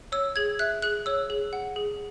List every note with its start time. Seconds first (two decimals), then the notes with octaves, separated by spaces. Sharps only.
0.12 C#5 E6
0.36 G#4 G#6
0.59 E5 F#6
0.82 G#4 F#6
1.06 C#5 E6
1.30 G#4
1.53 F#5
1.76 G#4